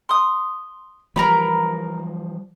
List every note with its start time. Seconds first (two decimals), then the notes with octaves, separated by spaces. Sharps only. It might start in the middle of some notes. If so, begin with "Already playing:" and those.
0.09 C6 D#6
1.16 E3 F3 G3 A#4 A#5 B5